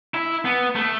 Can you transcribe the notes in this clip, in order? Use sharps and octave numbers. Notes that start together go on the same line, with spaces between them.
E4
B3
A3